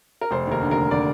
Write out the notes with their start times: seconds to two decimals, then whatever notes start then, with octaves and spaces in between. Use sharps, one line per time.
0.21 A#4
0.31 F1 C5
0.47 D#2 A#4
0.62 D3
0.71 A#4
0.77 F1
0.91 D3 D5